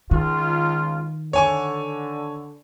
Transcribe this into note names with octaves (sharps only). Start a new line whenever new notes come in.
C#2 D#3 F4
D3 C#5 G#5 C#6